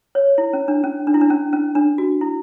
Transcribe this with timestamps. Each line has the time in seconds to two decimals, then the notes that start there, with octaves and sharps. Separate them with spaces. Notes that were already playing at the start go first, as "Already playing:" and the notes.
0.15 C#5
0.38 E4
0.53 C#4
0.68 D4
0.84 C#4
1.07 D4
1.14 E4
1.21 D4
1.30 C#4
1.53 C#4
1.75 D4
1.98 F#4
2.21 E4